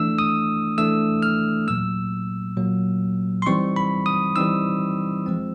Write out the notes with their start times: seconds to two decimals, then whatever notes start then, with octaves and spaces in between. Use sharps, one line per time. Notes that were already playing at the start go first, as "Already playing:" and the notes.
Already playing: E3 A3 D4 E6
0.19 D#6
0.78 E3 A3 D4 E6
1.23 F6
1.67 A#2 F#3 A#3 E6
2.57 A#2 F#3 A#3
3.42 C6
3.46 E3 G3 C4 D#4 C#6
3.76 B5
4.06 D#6
4.36 E3 G3 C4 D#4 E6
5.26 F3 G#3 C4